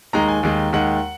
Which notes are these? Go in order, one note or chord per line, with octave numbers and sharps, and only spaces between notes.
D#2 D#3 G#3 A#5
G#5
D#2 D#3 G#3
D#2 D#3 G#3 F#5